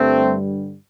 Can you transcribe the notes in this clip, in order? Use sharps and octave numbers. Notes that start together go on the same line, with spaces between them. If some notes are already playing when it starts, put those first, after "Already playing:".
Already playing: G2 D3 G3 A3 C4